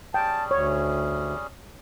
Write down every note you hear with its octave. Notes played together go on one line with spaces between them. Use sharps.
G3 C#4 G#4 G5 A5
D2 C#5